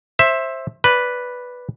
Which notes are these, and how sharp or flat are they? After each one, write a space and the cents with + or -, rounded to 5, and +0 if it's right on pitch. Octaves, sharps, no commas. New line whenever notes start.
C5 +20 E5 +0
B4 +0 D5 -10